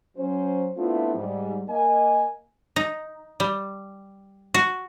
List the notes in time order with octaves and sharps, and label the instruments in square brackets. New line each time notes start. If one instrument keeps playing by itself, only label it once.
[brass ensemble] F#3 C#4 C5
A3 B3 C4 D4 E4 F4
G#2 G3
A#3 D#5 G#5
[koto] D#4
G3
F#4